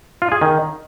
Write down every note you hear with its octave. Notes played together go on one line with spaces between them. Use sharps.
F4
G#4
D#3